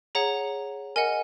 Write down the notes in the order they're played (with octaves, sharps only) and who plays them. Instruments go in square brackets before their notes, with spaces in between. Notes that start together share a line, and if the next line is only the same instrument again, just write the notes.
[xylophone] G#4 C#5 F#5 A#5
A#4 D#5 F#5 G#5